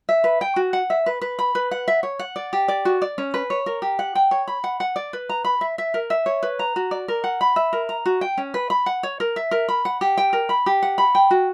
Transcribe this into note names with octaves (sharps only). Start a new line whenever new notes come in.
E5
B4
G5
F#4
F#5
E5
B4
B4
B5
B4
F#5
E5
C#5
F#5
D5
G4
D5
F#4
D5
C#4
B4
C#5
A#4
G4
F#5
G5
C#5
B5
F#5
F#5
D5
B4
A#5
B5
E5
E5
A#4
E5
C#5
B4
A#5
F#4
D5
A#4
F#5
B5
E5
A#4
A#5
F#4
G5
C#4
B4
B5
F#5
C#5
A#4
E5
A#4
B5
F#5
G4
G5
A#4
B5
G4
F#5
B5
G5
F#4